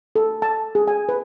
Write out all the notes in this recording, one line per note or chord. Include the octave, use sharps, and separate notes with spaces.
A4
A5
G#4
G#5
B4